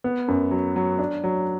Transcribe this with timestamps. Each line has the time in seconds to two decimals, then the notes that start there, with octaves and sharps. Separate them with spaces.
0.04 B3
0.28 F#2
0.51 F#3
0.76 F#3
0.99 D4
1.24 F#3